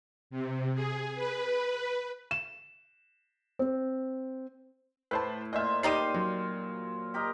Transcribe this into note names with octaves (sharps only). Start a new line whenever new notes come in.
C3
G#4
B4
E7
C4
A2 B4 C5 A5
A#2 F4 C5 D#5 E5
G3 D#4 G4 C7 D#7
F#3 F4
G4 A#4 D#5